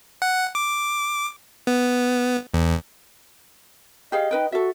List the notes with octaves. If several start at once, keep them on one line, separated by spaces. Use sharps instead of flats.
F#5
D6
B3
E2
G4 G#4 D#5 F5
D#4 B4 G5
F#4 A4 E5